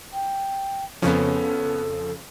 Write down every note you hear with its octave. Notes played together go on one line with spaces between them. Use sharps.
G5
F2 C#3 F3 B3 C#4 A4